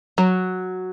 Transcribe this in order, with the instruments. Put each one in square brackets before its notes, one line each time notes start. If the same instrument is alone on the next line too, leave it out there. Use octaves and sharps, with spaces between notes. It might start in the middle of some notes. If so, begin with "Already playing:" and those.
[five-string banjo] F#3